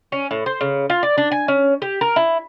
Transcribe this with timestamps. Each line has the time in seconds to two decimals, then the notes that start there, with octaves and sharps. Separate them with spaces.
0.12 C#4
0.31 A2
0.46 C5
0.61 C#3
0.90 F4
1.03 D5
1.18 D4
1.32 G#5
1.48 C#4
1.82 G4
2.01 A#4
2.16 E4